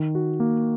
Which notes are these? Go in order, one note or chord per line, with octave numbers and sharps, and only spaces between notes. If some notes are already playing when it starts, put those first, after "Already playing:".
Already playing: D#3
F#4
A#3